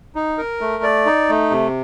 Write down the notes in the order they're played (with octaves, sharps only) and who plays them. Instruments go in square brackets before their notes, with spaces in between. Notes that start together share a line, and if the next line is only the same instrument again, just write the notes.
[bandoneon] D#4
A#4
A3
D5
D#4
A3
C3